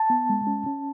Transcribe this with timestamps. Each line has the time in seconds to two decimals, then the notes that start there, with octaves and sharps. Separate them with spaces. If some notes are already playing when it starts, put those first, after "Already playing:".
Already playing: A5
0.10 B3
0.29 G#3
0.47 C#4
0.66 C#4